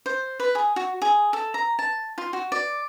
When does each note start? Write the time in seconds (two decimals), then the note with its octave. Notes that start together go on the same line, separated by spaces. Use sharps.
0.06 C5
0.40 B4
0.55 G#4
0.76 F#4
1.02 G#4
1.33 A4
1.54 A#5
1.79 A5
2.18 F4
2.33 F#4
2.52 D5